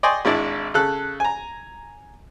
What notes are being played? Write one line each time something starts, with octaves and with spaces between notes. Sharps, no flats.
D5 D#5 G5 G#5 C6 C#6
G#1 G#3 D4 E4 D5
C#3 A4 F#6
G#5 A#5